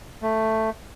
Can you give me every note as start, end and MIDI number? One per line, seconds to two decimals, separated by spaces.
0.22 0.70 57